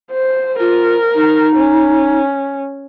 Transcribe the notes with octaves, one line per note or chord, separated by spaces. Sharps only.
C5
F4 A#4
D#4
C#4